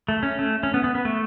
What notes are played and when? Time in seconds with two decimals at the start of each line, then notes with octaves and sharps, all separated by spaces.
0.09 A3
0.23 C#4
0.39 A3
0.63 C#4
0.74 B3
0.84 B3
0.95 B3
1.05 A3